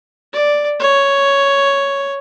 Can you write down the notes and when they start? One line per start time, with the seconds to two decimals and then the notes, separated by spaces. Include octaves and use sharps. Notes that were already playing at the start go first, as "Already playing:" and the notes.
0.33 D5
0.80 C#5